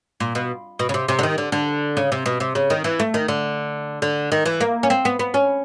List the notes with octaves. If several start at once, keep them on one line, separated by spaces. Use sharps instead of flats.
A#2
B2
B2
C#3
C3
C3
D3
D#3
D3
D3
C#3
C3
B2
C3
C#3
D#3
E3
A3
D#3
D3
D3
D#3
E3
A#3
C#4
C4
B3
B3
C#4